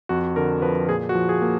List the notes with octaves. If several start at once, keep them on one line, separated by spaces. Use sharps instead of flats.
F2 F#4
D3 A#4
F3 B4
A#2 G#4
F#4
F3
G#4
A#3